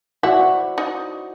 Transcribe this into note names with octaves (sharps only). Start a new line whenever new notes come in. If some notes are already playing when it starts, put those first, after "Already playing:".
E4 F#4 D5 E5 F#5
C5
D#4